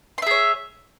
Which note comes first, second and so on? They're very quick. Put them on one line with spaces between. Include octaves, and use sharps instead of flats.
C6 E5 G#4 C#5